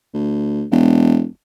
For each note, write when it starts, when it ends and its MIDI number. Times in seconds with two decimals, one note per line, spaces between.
0.14 0.65 38
0.71 1.25 28